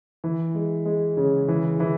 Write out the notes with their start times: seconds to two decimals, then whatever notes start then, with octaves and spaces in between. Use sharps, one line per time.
0.24 E3
0.55 G#3
0.85 G#3
1.17 C#3
1.48 E3
1.80 E3